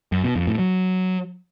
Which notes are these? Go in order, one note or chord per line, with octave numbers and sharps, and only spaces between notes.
F#2
B2
F2
A2
F#3